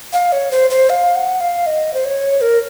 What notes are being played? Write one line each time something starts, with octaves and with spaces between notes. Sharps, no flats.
F5
C#5
C5
C5
F5
F#5
F5
D#5
C5
C#5
A#4